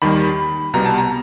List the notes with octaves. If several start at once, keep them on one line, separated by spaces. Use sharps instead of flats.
D#2 D#3 G3 B5
C2 B2 G3 B3 A#5
A5
A#5